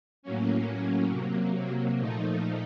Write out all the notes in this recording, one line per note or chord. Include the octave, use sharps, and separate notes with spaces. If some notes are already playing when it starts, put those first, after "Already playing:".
A2 F#3 A#3 C#4
C3 F#3 A#3
A#2 F3 A3 D#4